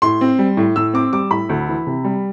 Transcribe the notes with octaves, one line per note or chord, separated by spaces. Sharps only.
A2 C6
C4
G3
A2
A2 E6
C4 D6
G3 D6
A2 B5
D2
E3
C3
G3